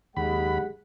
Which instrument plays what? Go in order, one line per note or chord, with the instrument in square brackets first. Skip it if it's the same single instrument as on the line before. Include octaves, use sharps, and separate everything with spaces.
[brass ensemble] F#1 G4 F#5 [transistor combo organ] D#2 B5 [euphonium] G#3